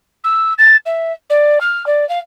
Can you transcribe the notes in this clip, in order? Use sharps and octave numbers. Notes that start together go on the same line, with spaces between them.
E6
A6
E5
D5
F6
D5
F5